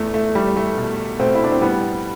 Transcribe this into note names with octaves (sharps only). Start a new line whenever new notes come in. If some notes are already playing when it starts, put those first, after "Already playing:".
Already playing: E2 A3
A3
E2 G3
A3
B2
B2 A3 C4
E4
D4
C4
A2 G3 B3